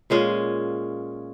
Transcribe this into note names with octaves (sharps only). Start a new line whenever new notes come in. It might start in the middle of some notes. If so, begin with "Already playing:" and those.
A#2 G#3 C#4 F4